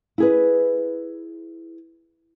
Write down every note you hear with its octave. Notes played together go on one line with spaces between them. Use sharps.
E4 G#4 B4